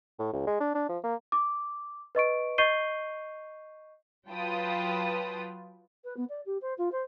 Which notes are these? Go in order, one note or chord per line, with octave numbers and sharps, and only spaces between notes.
A2
C#2
G#3
D4
D4
F3
A#3
D6
B4 D#5 C#6 D7
D#5 C#6 G6 C7 D#7 G7
F#3 F4 B4 G5 A5 D#6
B4
B3
D5
G4
C5
F4
C5